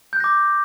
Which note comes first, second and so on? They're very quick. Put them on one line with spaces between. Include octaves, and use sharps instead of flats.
G6 F#6 A#6 D6